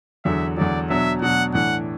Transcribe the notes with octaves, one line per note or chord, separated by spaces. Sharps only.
E2 D3 F#3 E5
E2 D3 F#3 D5
B2 F#3 D4 E5
B2 F#3 D4 F#5
A2 E3 D4 F#5